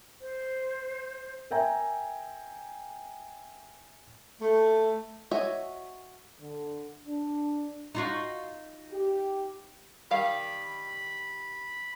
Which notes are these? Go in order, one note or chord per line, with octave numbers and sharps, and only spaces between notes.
C5
A#4 E5 G5 G#5 A#5
A3
F#4 C#5 D#5 E5 G#5
D3
D4
D#4 F4 F#4
G4
D#3 G3 F5 B5